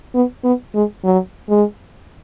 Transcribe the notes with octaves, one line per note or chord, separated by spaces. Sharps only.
B3
B3
G#3
F#3
G#3